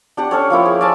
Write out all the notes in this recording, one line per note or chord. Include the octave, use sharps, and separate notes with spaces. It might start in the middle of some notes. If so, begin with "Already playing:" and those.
D4 G4 F#5
C#4 A4 C#5
F3 A#3 E4 G5
G#4
D5 E5 G#5 A5